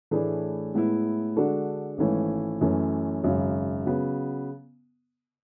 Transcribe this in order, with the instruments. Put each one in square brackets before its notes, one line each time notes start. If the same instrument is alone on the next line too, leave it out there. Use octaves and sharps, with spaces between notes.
[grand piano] A2 E3 A3 D4 G#4
A2 G#3 B3 E4
D3 G#3 D4 F#4 A4
G#1 G#2 E3 A3 C#4
F#2 E3 A3 C#4
G#1 F#2 C#3 F#3
C#3 F#3 B3